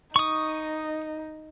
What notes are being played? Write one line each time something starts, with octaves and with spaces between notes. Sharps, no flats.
D#4 C#6 D#6